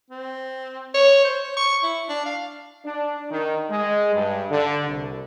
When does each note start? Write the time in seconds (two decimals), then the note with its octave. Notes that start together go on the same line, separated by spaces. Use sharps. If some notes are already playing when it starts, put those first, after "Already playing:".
0.10 C4
0.94 C#5
1.24 C5
1.43 C#5
1.56 C#6
1.83 E4
2.09 D4
2.25 F5
2.85 D4
3.31 D#3
3.70 G#3
4.13 G2
4.51 D3
4.87 C2